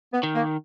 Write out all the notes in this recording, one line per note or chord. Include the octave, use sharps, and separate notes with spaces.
B3
D#3
A#3